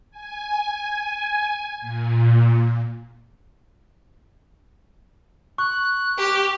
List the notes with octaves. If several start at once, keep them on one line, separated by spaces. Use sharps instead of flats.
G#5
A#2
C#6 F#6
G4